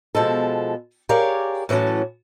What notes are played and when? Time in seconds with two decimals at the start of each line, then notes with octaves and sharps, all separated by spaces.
0.15 B2 F3 G#3 A4
1.09 G4 G#4 A#4 C#5 D5 F5
1.69 A2 E3 F#3 C#4 A5